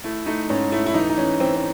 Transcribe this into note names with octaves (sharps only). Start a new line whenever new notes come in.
A3 E4
A3 D#4
G#2 C#4
A3 E4
E4
E3 D#4
D#4
E3 C#4
E3 C4
C4